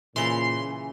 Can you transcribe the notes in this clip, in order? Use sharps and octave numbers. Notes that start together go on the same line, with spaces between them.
A#2 C#3 E3 C6